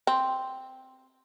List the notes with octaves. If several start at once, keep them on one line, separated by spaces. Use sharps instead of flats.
C4